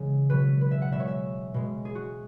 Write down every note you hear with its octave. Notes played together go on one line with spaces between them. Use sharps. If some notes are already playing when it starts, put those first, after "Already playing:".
Already playing: C#3 E3 G#3 G#4
B2 F#3 B4
B4
E5
F#5
B2 G#3 E5
C#5
E5
B2 G#3
G#4
F#4